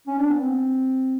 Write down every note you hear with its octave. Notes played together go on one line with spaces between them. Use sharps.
C#4
D4
B3
C4